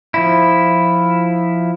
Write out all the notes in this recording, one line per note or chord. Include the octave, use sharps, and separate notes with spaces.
F3 E4